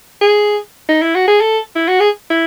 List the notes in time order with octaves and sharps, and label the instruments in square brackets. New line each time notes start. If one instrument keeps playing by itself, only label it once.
[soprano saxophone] G#4
D#4
E4
F#4
G#4
A4
E4
F#4
G#4
E4